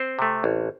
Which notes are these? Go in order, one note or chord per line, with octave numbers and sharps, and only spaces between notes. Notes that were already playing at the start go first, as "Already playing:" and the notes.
Already playing: C4 C5
C3 A3
A1